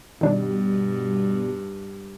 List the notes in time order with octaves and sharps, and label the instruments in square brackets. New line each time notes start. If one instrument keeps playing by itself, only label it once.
[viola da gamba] G2 [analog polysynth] B2 G3 [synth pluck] D#3 D4